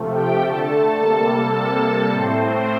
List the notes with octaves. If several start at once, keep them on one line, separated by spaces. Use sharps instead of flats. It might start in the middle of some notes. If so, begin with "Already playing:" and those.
Already playing: C3 F3 A3
G4 G5
D3 A3 A4 A5
C3 G3 A#3 A4 A5
C3 G3 A#3 A4 A5
A2 A3 C4 C5